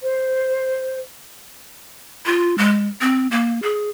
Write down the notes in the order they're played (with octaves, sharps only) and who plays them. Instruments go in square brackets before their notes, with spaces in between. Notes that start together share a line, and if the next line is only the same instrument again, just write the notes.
[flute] C5
[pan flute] F4
G#3
C4
A#3
G#4